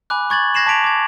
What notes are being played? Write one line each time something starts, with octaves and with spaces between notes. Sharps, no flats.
G#5 B5 D6 F#6
C#6 G#6 A6 F#7
F#6 G#6 A#6 C7 E7 F#7
A5 D6 B6 D7 F7
D6 G#6